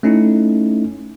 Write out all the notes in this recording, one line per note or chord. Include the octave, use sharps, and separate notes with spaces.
A3 C#4 D#4 E4